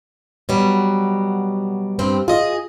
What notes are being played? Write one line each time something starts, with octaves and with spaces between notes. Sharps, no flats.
B2 F#3 G3
G2 C4 G4
F4 G#4 D#5